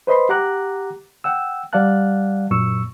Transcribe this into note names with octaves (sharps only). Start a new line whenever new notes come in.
B4 C5 D#5 B5 C6
G4 F#5 A#5 D6 F#6
F#5 G5 E6
G3 D5 F5 F#5 A5 F#6
F#2 A#2 C#6 E6